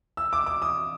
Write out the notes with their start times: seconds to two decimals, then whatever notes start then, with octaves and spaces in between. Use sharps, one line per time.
0.17 E6
0.33 D6
0.47 D6
0.62 D#6